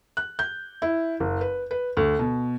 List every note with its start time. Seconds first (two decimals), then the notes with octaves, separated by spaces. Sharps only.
0.17 F#6
0.39 G6
0.82 E4
1.20 F#1
1.41 B4
1.71 B4
1.97 D2
2.19 B2